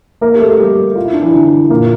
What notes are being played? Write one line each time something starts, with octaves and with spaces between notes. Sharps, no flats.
A#3 A#4
G4
A3 A4
A4
G3 G4
F4
E4
D4
E3 E4
D3 D4
A#2 A#3